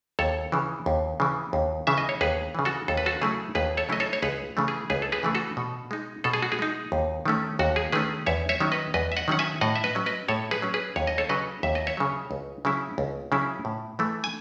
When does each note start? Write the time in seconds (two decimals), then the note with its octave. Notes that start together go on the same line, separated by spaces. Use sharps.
0.19 D#2 A4 C#5
0.52 C#3 E3
0.86 D#2
1.20 C#3 E3
1.53 D#2
1.87 C#3 E3 E5
1.98 D#5
2.09 C#5
2.21 D#2 G#4 B4
2.55 C#3 E3
2.65 F#4 A4
2.88 D#2 A4
2.97 B4
3.06 F#4 A4
3.21 C#3 F#3 A3 E4 G#4
3.55 D#2 G#4 B4
3.77 A4 C#5
3.89 C#3 F#3 A3 E4 D#5
4.00 A4 C#5
4.13 C#5
4.22 C#2 G#4 B4
4.57 C#3 E3 A3
4.68 G#4
4.90 C#2 G#4 B4
5.02 A4
5.12 G#4 B4
5.23 C#3 E3 A3
5.35 F#4 A4
5.57 B2
5.91 G#3 D#4
6.24 B2 A4
6.34 G#4
6.42 F#4
6.52 G#4
6.59 G#3 D#4
6.92 D#2
7.25 D#3 A3 C#4
7.59 D#2 F#4
7.76 G#4
7.92 D#3 A3 C#4 G#4 B4
8.26 E2 C#5 E5
8.49 C#5 E5
8.60 D#3 F#3 C#4
8.72 B4 D#5
8.94 E2 B4 D#5
9.12 E5
9.17 D#5 F#5
9.28 D#3 F#3 C#4 F#5
9.39 E5 G#5
9.61 A2 D#5 F#5
9.76 E5
9.84 B4 D#5
9.95 F#3 C#4
10.06 B4 D#5
10.28 A2 A4 C#5
10.51 G#4 B4
10.62 F#3 C#4
10.74 G#4 B4
10.96 D#2 C#5
11.07 D#5
11.18 A4 C#5
11.29 C#3 F#3 B4 D#5
11.63 D#2 E5
11.75 D#5
11.87 C#5 E5
11.97 C#3 F#3
12.31 C#2
12.65 C#3 F#3 C#4 E4
12.98 C#2
13.32 C#3 F#3 C#4 E4
13.65 A2
13.99 E3 A3
14.24 G#5